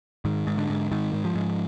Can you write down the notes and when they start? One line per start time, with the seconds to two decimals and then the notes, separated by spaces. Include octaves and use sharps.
0.25 G#2 D#3
0.47 G#2
0.58 D3
0.70 G#2
0.91 G#2 D#3
1.13 G#2
1.25 F3
1.35 G#2